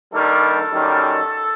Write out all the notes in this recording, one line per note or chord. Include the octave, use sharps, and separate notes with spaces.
G2 D#3 G3 A#3 A4
F#2 D#3 G3 A#3